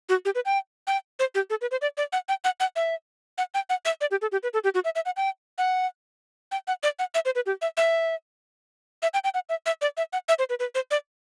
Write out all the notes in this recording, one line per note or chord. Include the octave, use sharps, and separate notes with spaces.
F#4
G4
B4
G5
G5
C5
G4
A4
B4
C5
D5
D5
F#5
G5
F#5
F#5
E5
F#5
G5
F#5
E5
D5
G4
A4
G4
B4
A4
G4
F#4
E5
E5
F#5
G5
F#5
G5
F#5
D5
F#5
E5
C5
B4
G4
E5
E5
E5
G5
G5
F#5
E5
E5
D5
E5
F#5
E5
C5
B4
B4
C5
D5